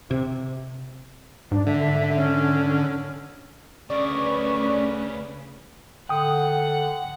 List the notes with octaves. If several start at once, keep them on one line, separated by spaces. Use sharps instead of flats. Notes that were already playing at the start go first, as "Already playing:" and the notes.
C3
G#2 D4
D3 E5
C#4
D2 C#3 C#4 A#4 B4 D5 C#6
D3 F#5 G5 D#6